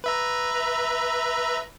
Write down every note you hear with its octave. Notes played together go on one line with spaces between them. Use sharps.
B4 E5 A#5